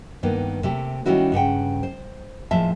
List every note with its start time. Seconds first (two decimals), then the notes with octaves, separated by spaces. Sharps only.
0.23 G2 D#3 A#3 B3
0.63 C3 A3 G4
1.06 D#3 G3 C#4 E4 F#4
1.32 G2 C#3 F#5 G5
1.83 C5
2.51 D#2 A2 F3 G#3 E5 A5